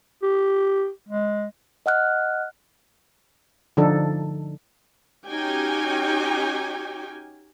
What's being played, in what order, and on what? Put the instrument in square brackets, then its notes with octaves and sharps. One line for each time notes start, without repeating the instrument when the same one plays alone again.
[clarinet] G4
G#3
[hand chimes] D#5 F#5 F6 F#6
[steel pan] D3 F3 D4 D#4 A4
[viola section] C#4 D#4 F#4 G4 G5 G#5